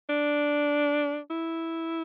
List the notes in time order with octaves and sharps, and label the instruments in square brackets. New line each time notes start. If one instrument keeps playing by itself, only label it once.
[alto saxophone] D4
E4